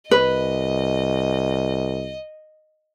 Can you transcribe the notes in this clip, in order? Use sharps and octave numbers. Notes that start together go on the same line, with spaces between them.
C2 B4 D#5